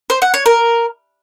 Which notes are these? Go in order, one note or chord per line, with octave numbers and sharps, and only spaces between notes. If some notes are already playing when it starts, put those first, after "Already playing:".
C5
F#5
C#5
A#4